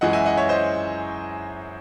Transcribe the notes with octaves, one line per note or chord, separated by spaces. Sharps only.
F#2 E3 G#3 D#5 F#5
E5 G#5
D#5 F#5
C#5 E5
C5 D#5